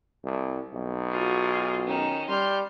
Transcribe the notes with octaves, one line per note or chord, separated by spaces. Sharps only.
C2
B1
F4 F#4 G#4
D#3 C#4 D#4
G3 C6 F6 G6